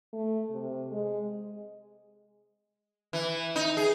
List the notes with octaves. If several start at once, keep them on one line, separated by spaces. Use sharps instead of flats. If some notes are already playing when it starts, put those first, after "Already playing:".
A3
C3
G#3
E3
D#4
G#4